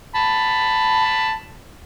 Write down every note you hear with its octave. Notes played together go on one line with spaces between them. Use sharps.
A5 B5